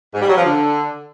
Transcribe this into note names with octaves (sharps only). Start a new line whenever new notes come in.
G#2
G3
F#3
F3
D3